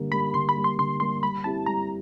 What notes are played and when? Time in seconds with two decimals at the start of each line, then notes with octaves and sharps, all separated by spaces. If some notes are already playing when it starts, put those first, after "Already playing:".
Already playing: D3 G3 A#3
0.12 G3 A#3 B5
0.34 D3 C6
0.49 B5
0.56 G3 A#3
0.64 C6
0.78 D3 C6
1.00 G3 A#3 C6
1.23 G3 B5
1.44 C4 E4 G4 A5
1.66 G3 A#5